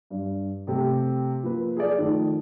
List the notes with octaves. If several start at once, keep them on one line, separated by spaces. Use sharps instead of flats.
G2
C3 A3 G4
F3 A#3 B4
G#4 A4 D5
D#3 F3 A3 A4